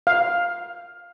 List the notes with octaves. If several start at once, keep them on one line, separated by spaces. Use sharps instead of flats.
F5